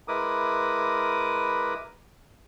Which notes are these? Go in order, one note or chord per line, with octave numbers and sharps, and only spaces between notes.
G#3 E4 A#4 B4 D6 D#6